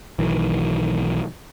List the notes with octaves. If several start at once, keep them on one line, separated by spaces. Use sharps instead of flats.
B1 D#3 E3